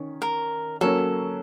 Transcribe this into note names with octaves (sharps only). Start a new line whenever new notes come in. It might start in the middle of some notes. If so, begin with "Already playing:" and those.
Already playing: D#3 C#4
A#4
F#3 A#3 C#4 A4